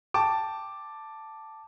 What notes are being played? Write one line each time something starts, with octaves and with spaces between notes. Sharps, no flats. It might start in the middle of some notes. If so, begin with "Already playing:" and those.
G5 A5 D6